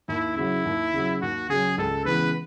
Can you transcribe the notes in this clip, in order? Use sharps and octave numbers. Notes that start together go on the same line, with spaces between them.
D#2 E4
C#3 F#3 E4
D#2
C#3 F#3
D#2 F#4
C#3 F#3 G#4
C#2 A4
C#3 E3 G#3 B3 B4